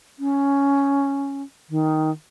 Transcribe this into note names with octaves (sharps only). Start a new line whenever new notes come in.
C#4
D#3